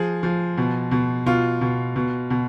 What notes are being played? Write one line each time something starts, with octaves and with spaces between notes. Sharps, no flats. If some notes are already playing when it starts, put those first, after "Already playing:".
Already playing: F3 G#4
F3
B2
B2
B2 F4
B2
B2
B2